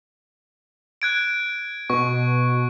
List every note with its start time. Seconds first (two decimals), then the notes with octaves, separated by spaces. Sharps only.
1.02 F#6 G#6 D7
1.90 B2 C#6